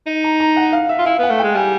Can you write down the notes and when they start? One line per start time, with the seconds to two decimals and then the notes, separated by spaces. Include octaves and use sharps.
0.07 D#4
0.24 A#5
0.40 A#5
0.56 F#5
0.72 F5
0.89 E5
0.99 F4
1.06 E4 F5
1.19 B3
1.23 F#5
1.30 A3
1.39 G#3 G5
1.55 G3 G#5